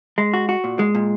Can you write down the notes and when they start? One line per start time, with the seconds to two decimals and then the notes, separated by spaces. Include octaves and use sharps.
0.18 G#3
0.34 F#4
0.49 F#4
0.64 A#2
0.79 G#3
0.95 A#2